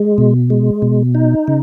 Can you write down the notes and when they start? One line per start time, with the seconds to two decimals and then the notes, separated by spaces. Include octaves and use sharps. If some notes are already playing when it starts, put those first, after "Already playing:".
Already playing: G#3
0.18 B2
0.50 G#3
0.82 B2
1.15 D#4
1.48 C#3